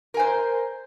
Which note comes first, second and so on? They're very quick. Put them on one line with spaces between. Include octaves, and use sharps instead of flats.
A#4 G#5 C5